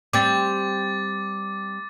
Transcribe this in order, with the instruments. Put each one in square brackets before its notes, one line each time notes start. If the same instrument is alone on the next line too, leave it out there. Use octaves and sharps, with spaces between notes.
[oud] G3 C4 [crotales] D6 A6